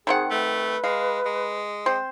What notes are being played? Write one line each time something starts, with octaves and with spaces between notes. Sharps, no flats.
D#3 C4 G#4 F#5
A3 B4
G#3 F5
G#3
C4 C5